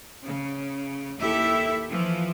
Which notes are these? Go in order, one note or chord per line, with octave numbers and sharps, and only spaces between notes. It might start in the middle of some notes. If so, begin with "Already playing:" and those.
C#3
D#2 E4 G4 A4 E5
E3 F3